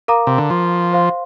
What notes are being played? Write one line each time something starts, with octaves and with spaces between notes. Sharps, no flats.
A#4 F5 A#5 D6
C3
D3
F3
C5 F5 C6